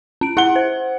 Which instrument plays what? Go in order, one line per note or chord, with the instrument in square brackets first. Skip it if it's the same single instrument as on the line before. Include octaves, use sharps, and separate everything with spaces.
[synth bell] C#4 D7
[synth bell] E4 [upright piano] F#5 G7
[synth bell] C5